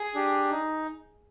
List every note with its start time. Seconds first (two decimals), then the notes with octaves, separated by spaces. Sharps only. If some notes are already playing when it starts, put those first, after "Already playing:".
Already playing: G#4
0.15 D4 G4
0.51 D#4